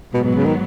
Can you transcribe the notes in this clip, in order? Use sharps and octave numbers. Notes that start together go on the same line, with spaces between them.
G#2 B2 F#3 B3
B2
C#3
D#3